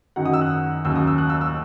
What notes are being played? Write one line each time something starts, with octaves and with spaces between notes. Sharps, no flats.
F#2 D#3 F#3 F#5
D#6
E6
F#6
D#2 C#3 F#3 E6
D#6
E6
F#6
E6
E6